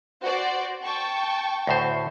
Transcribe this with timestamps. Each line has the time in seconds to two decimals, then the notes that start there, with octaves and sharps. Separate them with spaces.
0.23 F#4 C5 D5
0.84 G5 A5 C#6
1.67 D2 A2 C5